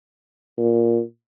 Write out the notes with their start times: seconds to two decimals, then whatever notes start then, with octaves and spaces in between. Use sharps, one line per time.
0.58 A#2